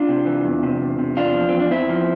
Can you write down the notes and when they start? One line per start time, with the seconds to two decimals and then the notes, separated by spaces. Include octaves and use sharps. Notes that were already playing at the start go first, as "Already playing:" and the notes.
Already playing: D4 F4
0.09 C3
0.26 E3
0.45 E2
0.63 C3
0.81 E2
0.99 C3
1.17 E2 D4 F4
1.35 F3
1.49 E2 C4
1.60 D4
1.71 E2 C4 E4
1.89 F3